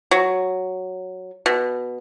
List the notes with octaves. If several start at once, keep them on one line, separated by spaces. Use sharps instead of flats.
F#3
B2